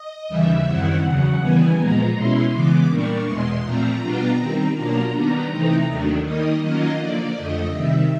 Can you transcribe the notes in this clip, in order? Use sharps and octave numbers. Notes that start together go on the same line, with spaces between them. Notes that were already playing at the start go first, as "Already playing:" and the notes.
Already playing: D#5
D#2 C#3 E3 G3 E5
F#2 D#3 G3 C4 E4 F#5
E2 C#3 F#3
D#2 C#3 E3 G3 B3 G#5
A#2 F3 G#3 B3 A#5
B2 G#3 C#4 E4 C6
C#3 E3 G#3 B3 D6
A#2 G3 A#3 D4 C#6
E2 B2 G#3 C6
A#2 F3 A3 C4 A#5
B2 G3 B3 D4 F4
D#3 G3 C4
B2 F#3 A#3 D4 F4 A#5
D#3 G3 B3 D4
C3 E3 A3 C4 D#4
D#2 D#3 F#3 A3 D4
D#3 G3 A#3 D#4 D#5
D#3 F#3 A#3 C#4 F4 D#5
D3 F3 A#3 D5
F2 D3 F3 A3 D#5
C3 D#3 G3 E5